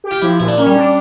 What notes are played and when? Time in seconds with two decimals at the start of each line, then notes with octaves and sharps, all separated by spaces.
0.04 G4
0.11 F4
0.22 F3 E4
0.40 A#2 E4
0.48 D4
0.58 A#3 C#4
0.67 G3
0.76 D4